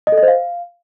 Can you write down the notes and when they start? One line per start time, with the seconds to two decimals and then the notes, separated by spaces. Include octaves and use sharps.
0.07 D#5
0.12 A4
0.17 D#5
0.23 C5
0.28 F5